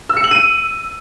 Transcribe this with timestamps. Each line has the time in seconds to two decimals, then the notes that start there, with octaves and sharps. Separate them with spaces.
0.09 E6
0.17 C#7
0.24 F#7
0.31 D#7